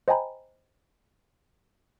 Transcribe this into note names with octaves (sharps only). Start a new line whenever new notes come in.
C5 D#5 G5 G#5 A#5 B5